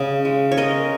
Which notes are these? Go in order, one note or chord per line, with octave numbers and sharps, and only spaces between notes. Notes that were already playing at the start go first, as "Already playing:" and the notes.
Already playing: C#3 D#5
G#3
C#5
G#3 A#4 D#5